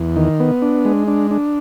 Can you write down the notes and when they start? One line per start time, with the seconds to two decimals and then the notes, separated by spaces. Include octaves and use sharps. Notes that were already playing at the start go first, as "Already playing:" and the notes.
Already playing: E2
0.16 D#3
0.40 B3
0.62 D4
0.85 G#3
1.07 D4
1.31 D4